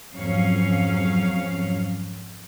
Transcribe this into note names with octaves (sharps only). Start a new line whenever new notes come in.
F2 G#2 F#3 C#4 F5